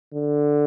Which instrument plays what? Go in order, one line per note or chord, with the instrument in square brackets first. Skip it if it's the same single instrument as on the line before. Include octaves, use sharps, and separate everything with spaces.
[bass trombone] D3